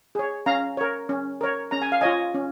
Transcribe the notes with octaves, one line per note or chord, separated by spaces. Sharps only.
G#4 C#5
C#4 F5 A#5
A#4 C#5
C#4
A#4 C#5
C#4 A#5
G#5
F5
F4 C#5 D#5 G#5
C#4